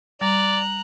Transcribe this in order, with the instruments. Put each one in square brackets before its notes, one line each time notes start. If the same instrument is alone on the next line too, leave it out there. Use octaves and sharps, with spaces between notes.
[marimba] G3 [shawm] D5 [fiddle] A#5 F#6